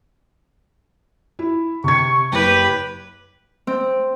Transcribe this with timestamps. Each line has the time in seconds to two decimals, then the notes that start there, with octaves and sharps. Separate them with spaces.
1.39 E4
1.84 C3 C#6 G#6
2.32 F#1 G4 B4
3.67 C4